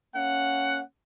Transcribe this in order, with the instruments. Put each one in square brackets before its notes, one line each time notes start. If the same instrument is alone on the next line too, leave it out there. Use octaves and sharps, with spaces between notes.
[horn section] A#3 C#4 F#5